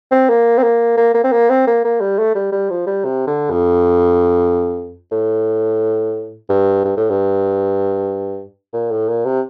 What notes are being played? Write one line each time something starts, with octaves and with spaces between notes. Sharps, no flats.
C4
A#3
C4
A#3
A#3
A#3
C4
A#3
C4
A#3
A#3
G3
A3
G3
G3
F3
G3
C3
D3
F2
A2
G2
G2
A2
G2
A#2
A2
A#2
C3